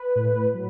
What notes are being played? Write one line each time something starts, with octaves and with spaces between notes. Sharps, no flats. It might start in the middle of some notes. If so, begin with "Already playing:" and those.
Already playing: B4
A2
F#3